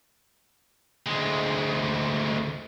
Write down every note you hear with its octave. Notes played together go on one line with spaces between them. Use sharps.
D2 G#3